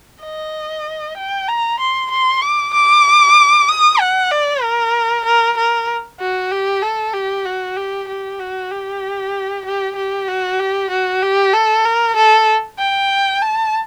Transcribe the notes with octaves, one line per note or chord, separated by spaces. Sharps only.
D#5
G5
A#5
C6
C6
D6
D6
D#6
F#5
D5
A#4
A#4
A#4
F#4
G4
A4
G4
F#4
G4
G4
F#4
G4
G4
G4
F#4
G4
F#4
G4
A4
A#4
A4
G5
A5